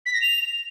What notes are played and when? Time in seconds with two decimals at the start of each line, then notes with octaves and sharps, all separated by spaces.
0.06 B6
0.13 A#6
0.21 F7